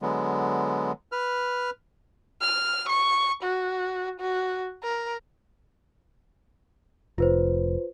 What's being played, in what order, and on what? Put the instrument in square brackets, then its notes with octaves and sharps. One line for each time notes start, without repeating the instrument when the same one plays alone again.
[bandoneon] D3 F#3 G#3 B3
B4 F6
[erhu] F6
C#6
F#4
F#4
A#4
[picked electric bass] F1 [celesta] F4 B4 C5